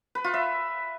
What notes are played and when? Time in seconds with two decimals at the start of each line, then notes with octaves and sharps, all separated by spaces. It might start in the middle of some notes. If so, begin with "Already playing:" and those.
0.15 B4
0.24 F4
0.34 E5